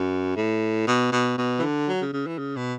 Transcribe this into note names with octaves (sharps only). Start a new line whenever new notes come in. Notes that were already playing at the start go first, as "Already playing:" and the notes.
Already playing: F#2
A2
B2
B2
B2
E3
D3
F#3
C#3
C#3
E3
C#3
B2